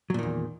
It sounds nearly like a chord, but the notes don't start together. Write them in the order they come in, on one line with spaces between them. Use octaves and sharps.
F#3 A#2 D#3 E2